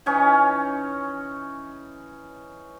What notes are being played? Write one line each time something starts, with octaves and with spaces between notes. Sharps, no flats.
E3 C#4 D#4 C#5